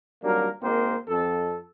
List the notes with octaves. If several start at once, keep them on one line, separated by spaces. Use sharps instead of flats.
G#1 F#3 G3 A#3 D4 A#4
G#1 G#3 A#3 C4 A#4 C5
F2 A4